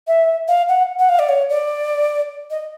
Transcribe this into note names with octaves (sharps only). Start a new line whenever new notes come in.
E5
F5
F#5
F#5
F5
D5
C#5
D5
D#5